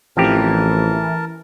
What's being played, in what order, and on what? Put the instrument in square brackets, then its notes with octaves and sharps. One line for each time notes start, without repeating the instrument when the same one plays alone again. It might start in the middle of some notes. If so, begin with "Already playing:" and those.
[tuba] A1 [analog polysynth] E3 [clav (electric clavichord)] F3 C4 G4 [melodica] A#4 A5